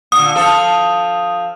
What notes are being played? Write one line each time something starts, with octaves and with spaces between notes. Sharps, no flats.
A#2 D3 D#6
F3 A4